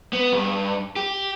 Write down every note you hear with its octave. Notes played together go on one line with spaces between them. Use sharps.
B3
G2
G4